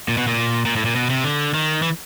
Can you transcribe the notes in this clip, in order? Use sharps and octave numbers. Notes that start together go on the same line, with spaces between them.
A#2
B2
A#2
A#2
A2
A#2
B2
C3
D3
D#3
E3